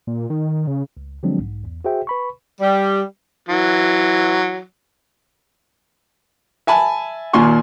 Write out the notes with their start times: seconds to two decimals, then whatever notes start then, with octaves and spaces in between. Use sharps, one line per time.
0.07 A#2
0.30 D#3
0.67 C#3
0.97 C#2
1.23 D3 F3 F#3 G#3 C4 D4
1.38 B1 G#2
1.64 E2
1.85 F#4 G#4 C5 E5 G5
2.07 B4 B5 C#6
2.60 G3
3.49 E3 F#3
6.67 E5 G#5 A5 B5
7.33 D#2 A#2 G#5 C6 C#6